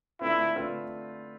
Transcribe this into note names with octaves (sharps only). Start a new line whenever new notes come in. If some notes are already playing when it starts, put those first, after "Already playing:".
D3 A3 C4 E4 F4 B4
D3 A3 C4 F4 B4